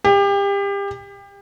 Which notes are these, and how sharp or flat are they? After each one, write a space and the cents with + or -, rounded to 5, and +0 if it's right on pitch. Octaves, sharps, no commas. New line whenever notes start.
G4 +30